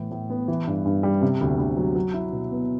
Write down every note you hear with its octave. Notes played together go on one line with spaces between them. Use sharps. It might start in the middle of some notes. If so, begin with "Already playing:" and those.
Already playing: A2 E3
A2
B3
E3
G2
G2
G3
C3
D2
D2
F#3
F#3
E4
B2
B3